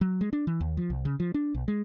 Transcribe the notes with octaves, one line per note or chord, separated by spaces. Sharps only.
F#3
G#3
D4
E3
D#2
F3
C2
C#3
F3
D4
B1
G#3